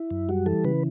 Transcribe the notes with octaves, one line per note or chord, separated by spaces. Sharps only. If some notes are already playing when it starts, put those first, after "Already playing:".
Already playing: E4
F#2
G3 F#4
E3 A4
C#3 B4